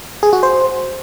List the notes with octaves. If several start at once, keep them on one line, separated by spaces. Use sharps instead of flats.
G#4
F#4
C5